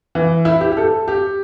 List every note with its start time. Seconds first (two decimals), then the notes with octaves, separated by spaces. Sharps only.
0.15 E3
0.45 E4
0.61 G4
0.72 G4
0.77 A4
1.08 G4